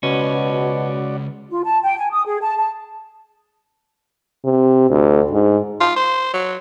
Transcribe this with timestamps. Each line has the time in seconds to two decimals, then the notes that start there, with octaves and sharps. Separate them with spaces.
0.03 C#2 B2 C#4 F#4 D5
1.50 F4
1.64 A5
1.84 G5
1.97 G#5
2.12 D#6
2.27 G#4
2.41 A5
2.57 A5
4.45 C3
4.91 D2
5.32 G#2
5.80 F4
5.96 C5
6.34 F#3